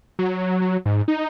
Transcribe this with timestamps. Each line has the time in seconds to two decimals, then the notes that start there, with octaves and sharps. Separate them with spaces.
0.19 F#3
0.61 F#3
0.86 G#2
1.08 D#4